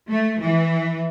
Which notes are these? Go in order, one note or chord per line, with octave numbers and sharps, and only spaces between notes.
A3
E3